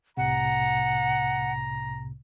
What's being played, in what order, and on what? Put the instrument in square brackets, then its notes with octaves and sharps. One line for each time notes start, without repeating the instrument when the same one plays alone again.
[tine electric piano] C2 A2 C3 [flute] F#5 [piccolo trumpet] A#5